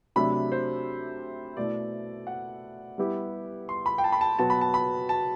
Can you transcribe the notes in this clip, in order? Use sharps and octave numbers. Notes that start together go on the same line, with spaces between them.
C3 F#3 A3 D4 B5
C5
B2 A3 E4 D5
F#5
G3 B3 E4 G4
C6
B5
G5
A5
B5
A5
B2 F#3 B3 F#4 A5
B5
A5
B5
A5